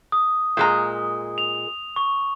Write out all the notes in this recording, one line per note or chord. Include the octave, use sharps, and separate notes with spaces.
D#6
A#2 G#3 A#5
F7
C#6